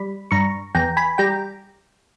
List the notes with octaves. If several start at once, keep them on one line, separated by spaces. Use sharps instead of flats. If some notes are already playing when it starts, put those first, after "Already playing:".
Already playing: G3 B5
G2 A#5 C#6
E2 G5 A#5
G#5 B5
G3 G5 A#5